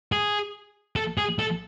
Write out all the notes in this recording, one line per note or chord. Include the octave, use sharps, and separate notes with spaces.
G#4
A4
G#4
A4